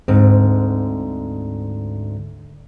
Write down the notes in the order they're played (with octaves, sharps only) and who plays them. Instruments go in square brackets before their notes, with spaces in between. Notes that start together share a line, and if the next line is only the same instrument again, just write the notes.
[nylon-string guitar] D2 G#2 C4